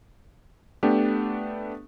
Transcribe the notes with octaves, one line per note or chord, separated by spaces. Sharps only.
A3 B3 D4 G4